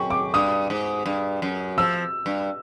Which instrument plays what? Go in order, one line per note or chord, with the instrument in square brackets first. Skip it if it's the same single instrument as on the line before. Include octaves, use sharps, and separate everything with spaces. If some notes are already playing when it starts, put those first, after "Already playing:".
Already playing: [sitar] F#2 [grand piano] G5 C#6
[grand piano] D6
[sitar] G2 [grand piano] D#6
[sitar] G#2
G2
F#2
[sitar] F3 [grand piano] E6
[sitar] G2